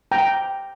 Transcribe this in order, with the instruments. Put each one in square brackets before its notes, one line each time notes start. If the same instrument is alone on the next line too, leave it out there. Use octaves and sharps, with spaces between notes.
[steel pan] G5 A#5